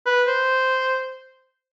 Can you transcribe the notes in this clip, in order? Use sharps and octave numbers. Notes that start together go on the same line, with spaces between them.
B4
C5